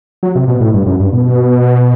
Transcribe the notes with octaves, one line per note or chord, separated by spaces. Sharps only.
F#3
C3
B2
A2
G2
F#2
G2
B2